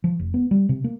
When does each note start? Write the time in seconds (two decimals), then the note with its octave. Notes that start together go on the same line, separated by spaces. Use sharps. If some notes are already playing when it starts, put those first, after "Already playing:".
0.04 F3
0.20 F1
0.34 B3
0.51 G3
0.69 C3
0.84 A#3